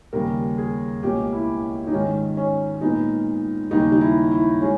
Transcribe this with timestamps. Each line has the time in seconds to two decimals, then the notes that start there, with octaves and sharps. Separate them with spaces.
0.13 D#2 C#3 G3 A#4
0.58 G#4
1.02 C#2 B2 A#3 C#4 G4
1.33 E4
1.87 D#4
1.92 G#2 D#3 G#3 C#4
2.37 C#4
2.81 A#2 G#3 B3 D#4
3.71 D#2 C#3 G3 D#4
3.92 D#4
4.01 E4
4.31 E4
4.61 G#3 C#4